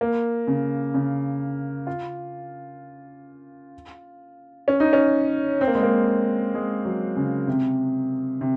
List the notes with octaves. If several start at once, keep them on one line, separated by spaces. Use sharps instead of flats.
A#3
C#3
C#3
F4
C#4
D#4
C#4
C4
A#3
G#3
A#3
G#3
F#3
C#3
C3
C3